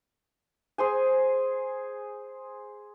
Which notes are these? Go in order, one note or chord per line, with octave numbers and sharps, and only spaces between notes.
G#4 C5 G#5